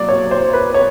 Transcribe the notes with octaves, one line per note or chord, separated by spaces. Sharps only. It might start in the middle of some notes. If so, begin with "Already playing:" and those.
Already playing: F#3 A#3 D5
C#5
C5
B4
C#5